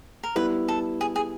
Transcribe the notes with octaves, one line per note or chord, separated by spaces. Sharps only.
A#4
G3 B3 E4 B4
A4
G#4
G#4